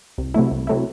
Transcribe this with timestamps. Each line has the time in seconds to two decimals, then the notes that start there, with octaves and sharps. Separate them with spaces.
0.18 C2
0.34 C3 F#3 A3 E4
0.51 C2
0.67 C3 F#3 A3 E4